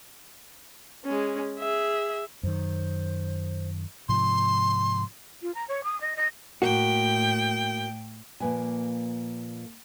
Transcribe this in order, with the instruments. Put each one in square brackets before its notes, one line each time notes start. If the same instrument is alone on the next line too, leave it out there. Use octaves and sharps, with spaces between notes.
[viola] G#3 C#4
G#4 E5
[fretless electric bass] F#2 D#3 [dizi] C5
[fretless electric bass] G#2 C3 F3 [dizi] C6
[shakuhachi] F4
A#5
C#5
D#6
D#5
D#5
[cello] A2 G5 [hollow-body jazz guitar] A#3 F#4
[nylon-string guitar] A#2 F3 A#3 B4 G#5